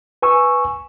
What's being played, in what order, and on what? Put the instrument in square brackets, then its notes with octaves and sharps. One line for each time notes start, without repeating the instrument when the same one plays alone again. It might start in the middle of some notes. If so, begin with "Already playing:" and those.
[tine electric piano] B4 G#5 C#6 E6